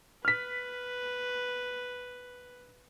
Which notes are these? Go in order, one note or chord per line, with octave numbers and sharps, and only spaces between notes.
B4 F6 B6